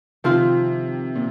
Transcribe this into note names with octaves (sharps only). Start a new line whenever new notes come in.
C3 D#3 F3 C4 F4
A#2